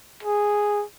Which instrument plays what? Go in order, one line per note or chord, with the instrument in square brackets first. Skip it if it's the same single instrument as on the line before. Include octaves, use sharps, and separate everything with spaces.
[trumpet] G#4